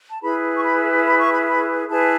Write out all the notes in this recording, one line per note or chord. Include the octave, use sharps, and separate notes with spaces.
A5
E4 G#4 B4 B5
C#6
B5
B5
C#6
B5
B5
E4 G#4 B4 A5